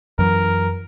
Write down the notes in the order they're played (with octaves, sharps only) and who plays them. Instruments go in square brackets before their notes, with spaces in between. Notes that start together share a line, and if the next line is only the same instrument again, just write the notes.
[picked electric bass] F#2 E3 F#3 [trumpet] A#4